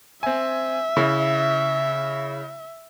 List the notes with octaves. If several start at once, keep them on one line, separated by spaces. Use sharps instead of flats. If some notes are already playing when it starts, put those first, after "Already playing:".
C4 E5 G#5
C#3 E4